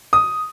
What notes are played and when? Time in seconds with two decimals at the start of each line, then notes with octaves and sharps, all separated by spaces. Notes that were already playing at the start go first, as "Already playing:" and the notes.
0.13 D#6